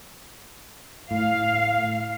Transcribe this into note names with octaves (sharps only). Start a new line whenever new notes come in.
A2 F5